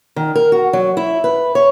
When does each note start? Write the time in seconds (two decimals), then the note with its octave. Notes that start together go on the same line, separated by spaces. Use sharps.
0.16 D#3
0.35 A#4
0.52 F#4
0.73 F#3
0.97 E4
1.24 B4
1.55 C#5